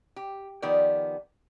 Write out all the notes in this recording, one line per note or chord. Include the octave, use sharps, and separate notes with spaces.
G4
D#3 F3 B3 G4 D5